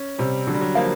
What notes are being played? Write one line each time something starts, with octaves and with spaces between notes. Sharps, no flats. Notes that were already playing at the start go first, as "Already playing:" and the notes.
Already playing: C#4
C3 G3
D3 F#3
G3
F#3
F3 A#3